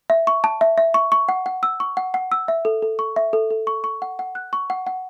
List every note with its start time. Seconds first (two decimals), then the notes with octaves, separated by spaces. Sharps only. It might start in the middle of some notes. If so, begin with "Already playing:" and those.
0.10 E5
0.27 C#6
0.44 A5
0.61 E5
0.78 E5
0.94 C#6
1.12 C#6
1.29 F#5
1.46 F#5
1.63 E6
1.80 C#6
1.97 F#5
2.14 F#5
2.32 E6
2.48 E5
2.65 A4
2.82 A4
2.99 C#6
3.16 E5
3.33 A4
3.51 A4
3.67 C#6
3.84 C#6
4.02 F#5
4.19 F#5
4.35 F#6
4.53 C#6
4.70 F#5
4.87 F#5